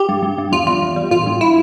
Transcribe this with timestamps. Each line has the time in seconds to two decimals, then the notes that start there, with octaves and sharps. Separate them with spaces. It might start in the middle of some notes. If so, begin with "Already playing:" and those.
Already playing: G4
0.09 G2
0.22 G2
0.38 G2
0.52 E2 F4
0.67 E2 F4
0.82 E2
0.96 G3
1.11 A1 F4
1.26 G2
1.41 E4